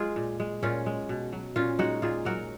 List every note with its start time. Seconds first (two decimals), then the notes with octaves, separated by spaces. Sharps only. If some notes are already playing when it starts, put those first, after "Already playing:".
Already playing: G#3 F4 G#4
0.16 A#2
0.40 G#3
0.63 A#2 C#4 F4
0.86 G#3
1.09 B2
1.32 F#3
1.56 A#2 C#4 F4
1.79 G#3 D#4 F#4
2.02 A#2 F4 G#4
2.25 F#3 F#4 A#4